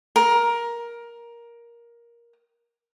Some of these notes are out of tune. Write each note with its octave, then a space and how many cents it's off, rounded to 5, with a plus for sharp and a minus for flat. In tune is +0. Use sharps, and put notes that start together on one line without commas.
A#4 +15